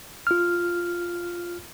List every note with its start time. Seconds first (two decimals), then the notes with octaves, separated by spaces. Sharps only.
0.27 F4 F6